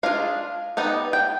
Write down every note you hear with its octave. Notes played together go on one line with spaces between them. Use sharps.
G#3 D4 F4 F5
G3 B3 D#4
G5